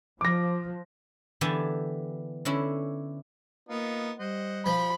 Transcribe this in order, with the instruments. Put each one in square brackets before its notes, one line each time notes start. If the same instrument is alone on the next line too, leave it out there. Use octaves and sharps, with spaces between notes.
[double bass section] F3 [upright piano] D6 A#6
[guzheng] D3 E3 B3 G4 G#5 A5
D3 C#4 E4
[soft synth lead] A#3 [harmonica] B3 D#4 F4
[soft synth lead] G3 [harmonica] C5 D#5 F#5
[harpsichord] F3 [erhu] B5